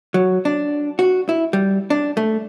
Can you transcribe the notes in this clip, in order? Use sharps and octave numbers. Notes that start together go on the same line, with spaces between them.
F#3
D4
F#4
E4
G3
D4
A3